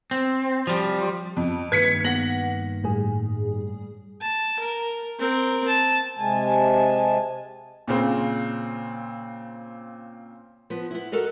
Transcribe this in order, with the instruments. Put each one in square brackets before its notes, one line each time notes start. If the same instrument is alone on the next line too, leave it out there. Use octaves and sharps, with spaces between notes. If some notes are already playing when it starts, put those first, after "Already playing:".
[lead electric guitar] C4
F3 G3
[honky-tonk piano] F2
[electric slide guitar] G2 D#3 A#3 [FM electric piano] B4 [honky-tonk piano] G#6 B6 C#7
[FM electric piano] B3 F#5 [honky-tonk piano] A#6 F#7
[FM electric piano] A2 G3 G#4
[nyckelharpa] A5
A#4
C4 A#4
A5
[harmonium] C3 G#3 G#5 A5
[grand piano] A#2 C#3 C4
[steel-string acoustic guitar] F3 B3
B3 E4
F#4 A4 A#4 D#5